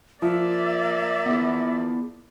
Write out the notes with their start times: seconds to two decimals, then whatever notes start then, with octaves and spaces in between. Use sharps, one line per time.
0.22 F3 A#3 D5 E5
1.26 B3 E4 G#4